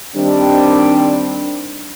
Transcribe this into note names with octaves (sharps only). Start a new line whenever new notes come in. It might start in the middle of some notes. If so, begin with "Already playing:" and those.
D#3 G3 C4 D4